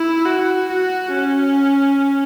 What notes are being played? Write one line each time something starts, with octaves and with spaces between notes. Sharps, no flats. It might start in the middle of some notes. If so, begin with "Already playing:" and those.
Already playing: E4
F#4
F#4
C#4